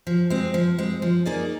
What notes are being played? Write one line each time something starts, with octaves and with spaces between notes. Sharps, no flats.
F3
G#3 C4
F3
G#3 C4
F3
A#3 D#4 G#4 D5